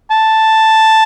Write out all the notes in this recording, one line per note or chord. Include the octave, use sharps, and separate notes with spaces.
A5